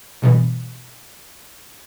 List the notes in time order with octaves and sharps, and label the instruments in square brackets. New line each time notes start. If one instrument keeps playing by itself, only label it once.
[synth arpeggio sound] G2 B2 E3